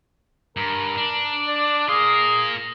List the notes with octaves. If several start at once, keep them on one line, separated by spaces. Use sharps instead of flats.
G2 A#4
D4
D5
F4 G#4 A#4